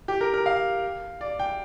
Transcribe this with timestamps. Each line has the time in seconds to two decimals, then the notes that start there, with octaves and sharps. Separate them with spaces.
0.08 G4
0.21 A#4
0.34 A#4
0.46 F5
1.21 D5
1.39 G5